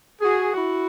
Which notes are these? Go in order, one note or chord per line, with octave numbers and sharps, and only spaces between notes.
F#4 G#4
E4 F#4